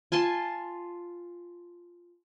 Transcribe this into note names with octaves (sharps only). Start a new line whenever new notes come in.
F4 G#5 A5 C6